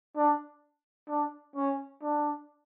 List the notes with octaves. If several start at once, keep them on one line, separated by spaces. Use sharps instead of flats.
D4
D4
C#4
D4